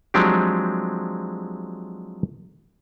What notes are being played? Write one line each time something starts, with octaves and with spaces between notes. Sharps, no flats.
F3 F#3 G#3 C4 D4 G4